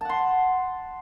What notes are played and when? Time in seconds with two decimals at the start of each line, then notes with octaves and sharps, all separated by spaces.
0.01 A5
0.05 F#5
0.09 C6